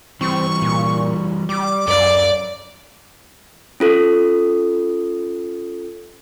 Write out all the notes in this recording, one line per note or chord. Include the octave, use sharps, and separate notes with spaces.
E3 G3 C4 C#6
A#2
G3 D6
F#2 A4 D5 F5
C#4 F4 A4